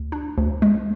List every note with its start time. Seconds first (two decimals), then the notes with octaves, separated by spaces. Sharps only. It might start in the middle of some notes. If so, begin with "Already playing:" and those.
Already playing: D2
0.12 D4
0.38 D2
0.62 G#3